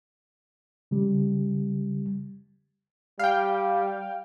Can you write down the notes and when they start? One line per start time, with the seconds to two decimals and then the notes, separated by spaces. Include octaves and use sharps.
0.91 C#3 G3
3.19 G3 F5 G5